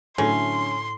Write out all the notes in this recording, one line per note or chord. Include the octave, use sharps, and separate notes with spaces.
A2 D3 F#3 A3 C#4 C6